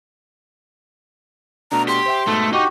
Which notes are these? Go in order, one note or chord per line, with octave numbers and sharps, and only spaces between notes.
B2 A3 D4 A#5
G4 C6
C5 E5 G5
G#2 B2 A3 A4
D#4 F#4 G4